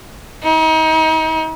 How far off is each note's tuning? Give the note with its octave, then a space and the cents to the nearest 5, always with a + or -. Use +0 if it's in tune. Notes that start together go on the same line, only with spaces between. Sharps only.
D#4 +35